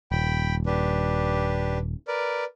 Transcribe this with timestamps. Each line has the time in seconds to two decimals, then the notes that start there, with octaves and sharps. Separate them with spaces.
0.12 D#1 G5 B5
0.66 D4 G4 B4
2.08 A#4 B4 D5